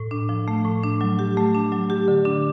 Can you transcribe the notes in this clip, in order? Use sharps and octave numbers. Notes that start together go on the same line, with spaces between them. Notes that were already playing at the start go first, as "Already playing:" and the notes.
Already playing: A2
D4
F3
A3
A2
D4
F#3
G4
A3
D4
F#3
G4
D3
D4